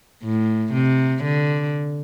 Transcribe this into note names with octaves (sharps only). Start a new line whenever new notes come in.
A2
C3
D3